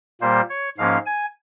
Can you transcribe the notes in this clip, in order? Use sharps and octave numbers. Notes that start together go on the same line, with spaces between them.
A#2 G3 A#3 C5
C#5
G#2 F3 A#3 C#4 F5
G#5